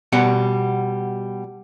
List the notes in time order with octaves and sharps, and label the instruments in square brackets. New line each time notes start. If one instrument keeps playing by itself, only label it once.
[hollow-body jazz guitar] B2 G3 F#5